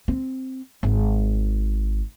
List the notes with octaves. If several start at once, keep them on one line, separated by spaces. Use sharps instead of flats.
C4
G#1